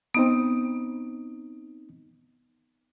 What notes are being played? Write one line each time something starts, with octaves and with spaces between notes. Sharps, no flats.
B3 C4 D#4 D#6